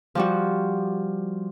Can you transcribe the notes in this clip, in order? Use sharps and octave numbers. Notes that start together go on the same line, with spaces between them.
F3 G3 F#4